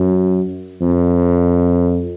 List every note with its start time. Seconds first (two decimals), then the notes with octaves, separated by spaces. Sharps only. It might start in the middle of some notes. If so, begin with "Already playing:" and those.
Already playing: F#2
0.81 F2